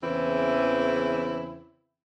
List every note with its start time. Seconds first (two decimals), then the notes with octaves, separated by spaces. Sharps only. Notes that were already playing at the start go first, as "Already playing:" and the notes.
0.03 E2 C#3 E3 C4 E4